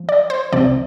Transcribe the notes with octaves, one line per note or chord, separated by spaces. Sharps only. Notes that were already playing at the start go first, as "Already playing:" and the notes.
Already playing: F3
D5
C5
C2 C3 F3 D5